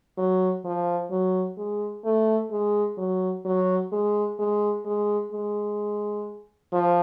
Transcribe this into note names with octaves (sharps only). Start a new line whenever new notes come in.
F#3
F3
F#3
G#3
A3
G#3
F#3
F#3
G#3
G#3
G#3
G#3
F3